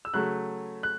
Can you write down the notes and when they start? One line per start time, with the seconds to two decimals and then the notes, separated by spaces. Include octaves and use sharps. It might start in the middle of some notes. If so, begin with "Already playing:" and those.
0.05 E6
0.14 C#3 F#3 A3 F#6
0.83 F#6